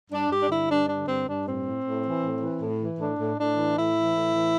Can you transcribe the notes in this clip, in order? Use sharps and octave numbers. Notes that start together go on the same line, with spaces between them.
G2 D4
G2 G4
D4
D3 E4
G2 D4
D3 D4
G2 C4
G2 D4
A2 C4
A2
A2
E3
A2
E3
A2
E3
A2 D4
A2
A2 D4
E3
A2 E4
E3
A2
E3